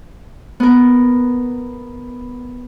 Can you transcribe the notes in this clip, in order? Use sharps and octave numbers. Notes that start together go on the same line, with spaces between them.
B3 A#4